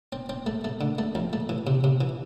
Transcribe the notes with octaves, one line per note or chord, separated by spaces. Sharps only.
C4
C4
A3
A3
D3
A3
F2
A3
E3
C3
C3
E3